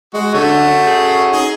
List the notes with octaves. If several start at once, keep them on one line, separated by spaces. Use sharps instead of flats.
G#3 F#4
D3 A3 C#4 F#4
G#4
D#4 G#4 D#5